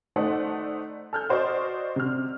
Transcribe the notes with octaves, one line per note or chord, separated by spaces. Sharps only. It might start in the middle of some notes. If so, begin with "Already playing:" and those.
A3 D#4 C5 D5 F#5
A4 F6 G6
F#4 C5 D5 D#5 C#6
C3 F6